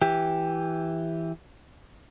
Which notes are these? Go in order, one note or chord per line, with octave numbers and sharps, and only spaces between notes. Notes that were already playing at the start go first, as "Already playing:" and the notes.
E3 G4